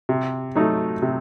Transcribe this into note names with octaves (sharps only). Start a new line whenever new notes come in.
C3
F#3 A3 D#4
C3